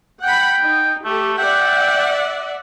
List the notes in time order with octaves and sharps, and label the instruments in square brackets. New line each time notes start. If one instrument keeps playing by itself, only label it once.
[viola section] F#5 B5 [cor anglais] G5
[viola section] D#4
[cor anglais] A3 [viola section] G4 A4
[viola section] D5 E5 F#5 [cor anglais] G5